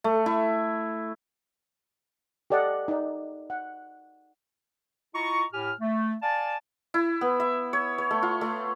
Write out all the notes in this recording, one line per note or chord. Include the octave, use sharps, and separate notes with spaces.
A3
E4
G4 A4 D5 D#5 F#5
D#4 D5
F#5
E4 F4 D#5 A#5 C#6
A2 G4 G#5 F6
A3
D5 F5 G#5 A5
E4
B3
E5
C#5
C#5
A3
F4
A3